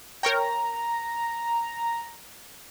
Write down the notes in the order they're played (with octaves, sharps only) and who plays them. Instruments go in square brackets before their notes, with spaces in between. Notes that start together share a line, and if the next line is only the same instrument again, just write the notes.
[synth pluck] A#4 C#5 G5 [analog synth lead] A#5